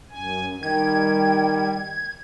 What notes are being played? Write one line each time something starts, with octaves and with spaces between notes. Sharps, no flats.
F#2 G#5
D#3 G3 G5 G#6